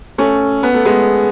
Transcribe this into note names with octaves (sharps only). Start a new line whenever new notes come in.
A3 C#4
B3
A3
G#3 B3